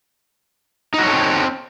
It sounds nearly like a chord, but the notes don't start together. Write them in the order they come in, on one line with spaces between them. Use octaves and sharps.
D#4 F#4 C#5 A4 C4